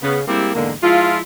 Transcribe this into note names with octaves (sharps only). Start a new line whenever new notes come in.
C#3 B3
G3 G#3 A#3 C4 E4 G4
E2 G#2 D3 G#3 A#3
F3 G#3 E4 F4